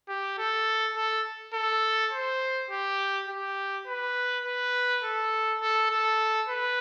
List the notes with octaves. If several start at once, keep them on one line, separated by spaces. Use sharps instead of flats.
G4
A4
A4
A4
C5
G4
G4
B4
B4
A4
A4
A4
B4